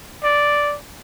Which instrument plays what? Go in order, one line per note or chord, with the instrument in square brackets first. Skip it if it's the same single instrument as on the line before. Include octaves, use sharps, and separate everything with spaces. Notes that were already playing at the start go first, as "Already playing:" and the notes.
[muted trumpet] D5